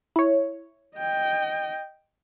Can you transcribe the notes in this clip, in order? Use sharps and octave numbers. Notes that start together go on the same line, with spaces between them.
E4 C#5
D#5 G5